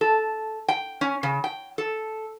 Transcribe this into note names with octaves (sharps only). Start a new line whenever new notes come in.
A4
G5
C#4
C#3
G5
A4